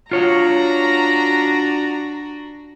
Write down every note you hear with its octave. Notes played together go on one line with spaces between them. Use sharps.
D4 F4 F#4 C#5 A#5